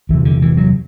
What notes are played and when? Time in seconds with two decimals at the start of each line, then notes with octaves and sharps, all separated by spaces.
0.09 E2 C3 E3
0.25 D3
0.42 E3
0.57 F#3